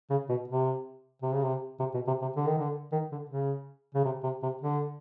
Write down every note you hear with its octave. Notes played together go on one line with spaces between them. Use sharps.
C#3
B2
C3
C3
C#3
C3
C3
B2
C3
C3
D3
D#3
D3
D#3
D3
C#3
C#3
C3
C3
C3
D3